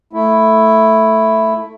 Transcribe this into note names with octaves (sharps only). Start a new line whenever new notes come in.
A3 E4